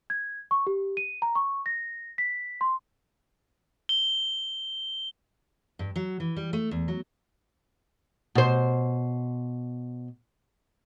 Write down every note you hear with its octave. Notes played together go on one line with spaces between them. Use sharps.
G#6
C#6
G4
D#7
A#5
C#6
A#6
B6
C6
G7
G2
F#3
E3
G3
A3
E2
F#3
B2 C5